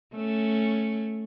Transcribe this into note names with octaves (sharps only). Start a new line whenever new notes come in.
A3 C#4